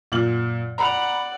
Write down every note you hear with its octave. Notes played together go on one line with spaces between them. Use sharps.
F#2 A#2 F#7
D5 F#5 A#5 B5 F7